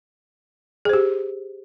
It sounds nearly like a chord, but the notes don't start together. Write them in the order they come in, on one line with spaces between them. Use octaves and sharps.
G#4 C5 G4